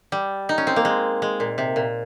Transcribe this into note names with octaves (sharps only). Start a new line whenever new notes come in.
G3
D#4
C#4
C4
A#3
G#3
G#3
A#2
C3
A#2